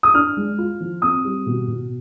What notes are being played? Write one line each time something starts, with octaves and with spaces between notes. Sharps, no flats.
D#6
D4 F6
G#3
F4
F3
C4 D#6
G3
B2
B2